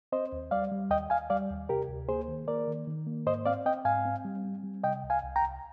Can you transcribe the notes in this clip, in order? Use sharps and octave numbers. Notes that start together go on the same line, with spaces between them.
C4 C5 D#5
D#2
G3 D5 F5
G3
D#2 D#5 G5
D#2 F5 G#5
G3 D5 F5
D#2
C3 G4 A#4
D2
A#3 G#4 C5
D#3
A#3 A#4 D5
D#3
D#3
A#3
G#2 C5 D#5
C4 D5 F5
C4 D#5 G5
G#2 F5 G#5
C4
G3
C4
G3
C3 D#5 G5
C2
F5 G#5
C2
G5 A#5
C2